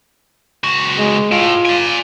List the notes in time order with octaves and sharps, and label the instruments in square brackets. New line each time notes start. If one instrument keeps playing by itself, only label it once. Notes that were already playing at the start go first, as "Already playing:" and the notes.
[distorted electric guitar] C#2 F#4
[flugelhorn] G#3
[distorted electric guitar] A2 [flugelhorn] F4
[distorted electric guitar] D5 G#5